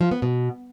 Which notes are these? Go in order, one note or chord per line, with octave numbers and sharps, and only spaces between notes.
F3
B3
B2